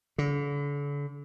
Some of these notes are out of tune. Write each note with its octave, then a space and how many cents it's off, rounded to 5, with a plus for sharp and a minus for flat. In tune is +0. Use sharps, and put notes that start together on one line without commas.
D3 -40